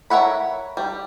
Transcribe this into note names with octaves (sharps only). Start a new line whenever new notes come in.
A#4 C#5 E5 F#5 B5
G3